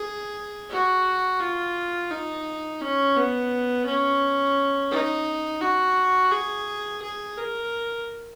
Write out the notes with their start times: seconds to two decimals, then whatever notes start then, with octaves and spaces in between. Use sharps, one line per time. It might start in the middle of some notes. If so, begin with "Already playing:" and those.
Already playing: G#4
0.70 F#4
1.40 F4
2.10 D#4
2.81 C#4
3.16 B3
3.86 C#4
4.91 D#4
5.61 F#4
6.31 G#4
7.02 G#4
7.38 A#4